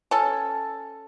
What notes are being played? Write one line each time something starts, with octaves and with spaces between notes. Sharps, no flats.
C#4 A4